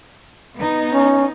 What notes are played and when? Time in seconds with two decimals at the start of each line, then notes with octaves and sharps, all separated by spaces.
0.58 B3 D#4
0.93 C#4